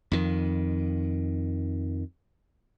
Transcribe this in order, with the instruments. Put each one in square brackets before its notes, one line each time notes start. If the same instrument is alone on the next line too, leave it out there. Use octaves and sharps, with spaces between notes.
[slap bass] F2 D#3